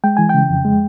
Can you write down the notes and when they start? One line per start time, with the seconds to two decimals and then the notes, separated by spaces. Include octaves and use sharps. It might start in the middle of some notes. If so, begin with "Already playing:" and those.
0.04 G#3 G5
0.17 E3 G#5
0.29 C#3 G5
0.49 F2
0.65 G#3